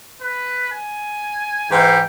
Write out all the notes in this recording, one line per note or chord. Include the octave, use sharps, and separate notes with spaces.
B4
G#5
G#2 E3 G4